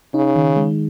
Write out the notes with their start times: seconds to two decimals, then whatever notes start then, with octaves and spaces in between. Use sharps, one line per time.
0.14 C#3 D#4
0.36 D#3
0.56 G#3